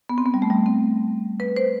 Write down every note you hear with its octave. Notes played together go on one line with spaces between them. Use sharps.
B3
C4
B3
G3
A3
G3
C4
B4
C5